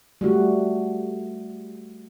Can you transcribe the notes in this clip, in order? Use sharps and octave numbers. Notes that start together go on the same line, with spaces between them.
G3 A3 F#4